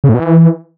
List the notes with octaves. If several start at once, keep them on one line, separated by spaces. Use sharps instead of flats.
C#3
A2
B2
E3